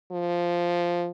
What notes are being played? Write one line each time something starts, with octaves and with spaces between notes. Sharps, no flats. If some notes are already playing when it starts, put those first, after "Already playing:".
F3